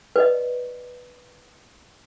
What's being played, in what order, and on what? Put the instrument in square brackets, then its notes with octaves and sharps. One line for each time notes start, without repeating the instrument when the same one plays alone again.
[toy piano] B4 D5 D#5